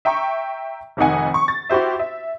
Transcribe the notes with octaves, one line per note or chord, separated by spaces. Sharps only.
E5 G5 A#5 C#6
F1 F2 D#3 D#4 F#5 G#5
C#6
A6
E4 F#4 G4 C5 E5
E5